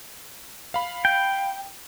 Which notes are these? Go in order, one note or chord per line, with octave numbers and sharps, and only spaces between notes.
F5 B5
G5